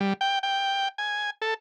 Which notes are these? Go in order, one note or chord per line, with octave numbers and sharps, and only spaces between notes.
G3
G5
G5
G#5
A4